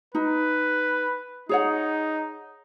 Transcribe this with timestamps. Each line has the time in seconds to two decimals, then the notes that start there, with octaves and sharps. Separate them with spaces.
0.15 D#4 B4
1.49 D#4 G#4 C#5 F#5